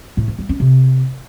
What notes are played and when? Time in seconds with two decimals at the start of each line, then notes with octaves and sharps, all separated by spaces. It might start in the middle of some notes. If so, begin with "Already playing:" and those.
0.17 A2
0.28 E3
0.39 G3
0.49 C#4
0.60 C3